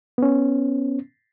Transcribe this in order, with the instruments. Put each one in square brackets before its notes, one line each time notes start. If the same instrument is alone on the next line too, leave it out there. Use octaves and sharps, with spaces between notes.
[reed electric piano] B3 C#4